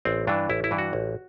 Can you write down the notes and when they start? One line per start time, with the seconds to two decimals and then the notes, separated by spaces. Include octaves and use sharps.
0.05 A1 C4
0.27 G2 E3 D4
0.49 A1 E4
0.64 E4
0.71 G2 E3
0.78 F#4
0.93 A1